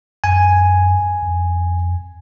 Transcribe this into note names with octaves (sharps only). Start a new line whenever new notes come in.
F#2 G#5
F2